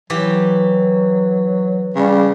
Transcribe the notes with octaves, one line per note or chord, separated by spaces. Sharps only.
E3 F#3 G4
C#3 G3